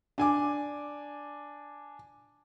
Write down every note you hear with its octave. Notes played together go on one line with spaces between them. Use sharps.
D4 G#5 D6